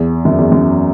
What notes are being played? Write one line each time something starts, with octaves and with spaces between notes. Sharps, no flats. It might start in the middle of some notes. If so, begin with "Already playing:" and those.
Already playing: E2
F#2
E2
F#2